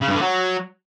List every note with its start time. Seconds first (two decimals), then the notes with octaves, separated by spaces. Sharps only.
0.02 C#3
0.09 G2
0.15 D3
0.22 F#3